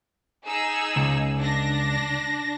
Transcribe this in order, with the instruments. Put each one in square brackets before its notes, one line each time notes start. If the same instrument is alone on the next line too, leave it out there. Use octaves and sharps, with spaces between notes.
[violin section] D#4 G#4 E6
[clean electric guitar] C#2
[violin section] D4 A#6